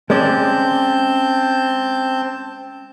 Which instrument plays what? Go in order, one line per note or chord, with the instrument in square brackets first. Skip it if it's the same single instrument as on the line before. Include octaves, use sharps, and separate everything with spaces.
[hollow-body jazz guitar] G#3 C#4 D5 [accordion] C4 A5 G6